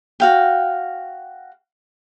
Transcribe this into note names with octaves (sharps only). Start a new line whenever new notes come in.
F#4 F5 G5